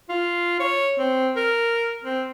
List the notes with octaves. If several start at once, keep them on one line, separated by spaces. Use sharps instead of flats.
F4
C#5
C4
A#4
C4